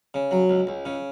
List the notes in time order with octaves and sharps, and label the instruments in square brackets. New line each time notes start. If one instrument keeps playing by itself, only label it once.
[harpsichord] C#3
F#3
C#2
C#2
C#3